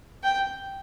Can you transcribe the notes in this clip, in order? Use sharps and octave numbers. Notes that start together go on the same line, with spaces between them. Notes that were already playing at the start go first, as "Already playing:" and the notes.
G5